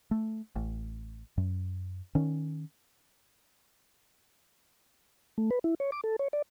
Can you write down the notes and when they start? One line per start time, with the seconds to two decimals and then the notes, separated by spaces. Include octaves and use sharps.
0.11 A3
0.56 A1
1.37 F#2
2.15 D#3 C#4
5.38 A3
5.51 B4
5.64 E4
5.80 C#5
5.92 D6
6.04 A4
6.19 C#5
6.33 D5